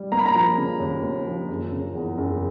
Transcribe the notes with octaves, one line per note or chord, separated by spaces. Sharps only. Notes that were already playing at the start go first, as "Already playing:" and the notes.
Already playing: G3
A#3 A#5
B5
A#5
F3
C#3
D#2
A#3
F3
F#1
C#3
E2
F#1